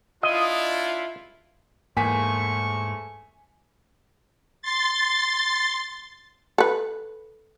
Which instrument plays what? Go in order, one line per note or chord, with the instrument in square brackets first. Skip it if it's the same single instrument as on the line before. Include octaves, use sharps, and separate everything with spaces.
[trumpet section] D4 E4 F4 [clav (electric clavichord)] D#5
[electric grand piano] E2 A#3 B6 [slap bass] G#2 [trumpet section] A3 C5 C#6 [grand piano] G#5
[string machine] C6 A6
[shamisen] A4 B4